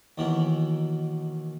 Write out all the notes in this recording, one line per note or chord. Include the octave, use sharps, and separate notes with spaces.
D#2 B2 D#3 E3